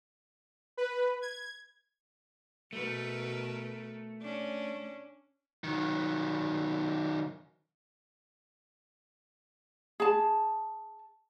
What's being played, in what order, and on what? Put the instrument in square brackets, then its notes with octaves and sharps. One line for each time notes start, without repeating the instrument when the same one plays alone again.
[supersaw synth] B4
G#6
[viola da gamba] B2 A#4 B4 [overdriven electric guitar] A3
[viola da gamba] C#4 D4
[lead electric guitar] D#3 F#3
[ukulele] G#4 A5